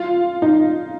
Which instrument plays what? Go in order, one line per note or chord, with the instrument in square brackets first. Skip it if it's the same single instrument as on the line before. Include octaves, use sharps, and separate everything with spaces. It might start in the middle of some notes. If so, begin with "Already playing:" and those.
Already playing: [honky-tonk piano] F4
D#4